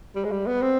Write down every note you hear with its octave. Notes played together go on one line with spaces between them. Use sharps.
G3
G#3
G3
B3
C4